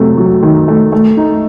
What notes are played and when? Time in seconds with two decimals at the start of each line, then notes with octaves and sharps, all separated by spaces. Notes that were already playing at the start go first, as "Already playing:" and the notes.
Already playing: C3 F#3 A3
0.17 F#3
0.42 D#3
0.68 A3
0.92 A3
1.17 D#4